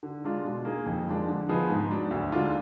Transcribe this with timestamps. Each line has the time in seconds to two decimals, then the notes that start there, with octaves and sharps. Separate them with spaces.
0.03 D3
0.24 G#3 D4 F4
0.44 B2
0.65 A#3 D#4 G#4
0.86 F2
1.07 F3 G#3 D4
1.28 D3
1.48 F3 B3 D#4 G#4
1.70 G#2
1.91 F#3 D4
2.11 D2
2.32 D3 G#3 D4 F4